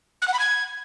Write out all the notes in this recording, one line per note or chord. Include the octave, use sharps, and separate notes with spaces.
F#6
F#5
B5
G#6